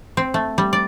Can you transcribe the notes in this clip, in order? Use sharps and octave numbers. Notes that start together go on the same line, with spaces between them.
C4
A3
G3
D5